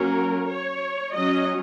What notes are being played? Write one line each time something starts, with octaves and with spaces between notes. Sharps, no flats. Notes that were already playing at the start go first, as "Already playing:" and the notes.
Already playing: F#3 A#3 C#4 A#4
C#5
F#3 C#4 D#5